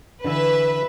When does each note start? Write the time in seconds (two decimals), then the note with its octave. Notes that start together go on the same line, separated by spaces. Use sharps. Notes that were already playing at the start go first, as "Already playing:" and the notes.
0.24 D3 E3 E4 B4 E5